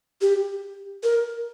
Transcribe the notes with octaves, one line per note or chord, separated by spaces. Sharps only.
G4
A#4